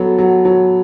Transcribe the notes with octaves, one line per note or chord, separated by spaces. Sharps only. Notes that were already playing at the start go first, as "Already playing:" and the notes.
Already playing: F#3 B3 A4
F#3
F#3